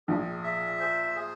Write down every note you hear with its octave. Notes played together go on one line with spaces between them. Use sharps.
A#1 A#2 G#4
E5
C5
G#4